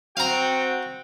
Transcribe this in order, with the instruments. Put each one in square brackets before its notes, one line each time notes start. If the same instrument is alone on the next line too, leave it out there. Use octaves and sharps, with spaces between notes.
[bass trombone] C4 [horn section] F#4 G5 [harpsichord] F5 A#5